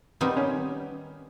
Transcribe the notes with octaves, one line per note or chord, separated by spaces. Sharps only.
D#3 G3 B3 C4 D#4
C#4